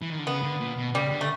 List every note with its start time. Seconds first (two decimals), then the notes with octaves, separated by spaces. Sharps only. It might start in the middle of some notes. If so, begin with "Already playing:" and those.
0.02 E3
0.10 D#3
0.19 D3
0.26 C#3 B3
0.43 D3
0.60 A#2
0.77 B2
0.94 C#3 G3
1.11 D3
1.21 A3